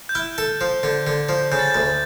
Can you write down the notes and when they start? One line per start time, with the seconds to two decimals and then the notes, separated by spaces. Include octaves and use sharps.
0.09 G6
0.15 E4 F6
0.38 A4
0.61 F3
0.83 D3
1.07 D3
1.29 F3
1.52 C#3 G6
1.59 A6
1.67 G6
1.75 D2